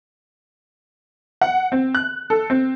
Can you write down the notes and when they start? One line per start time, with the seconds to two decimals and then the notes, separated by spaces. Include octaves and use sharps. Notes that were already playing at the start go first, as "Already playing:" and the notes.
1.41 F#5
1.72 C4
1.95 F#6
2.30 A4
2.50 C4